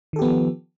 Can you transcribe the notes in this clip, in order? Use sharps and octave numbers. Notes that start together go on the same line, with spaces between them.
D#3 F3 B3 G4 A4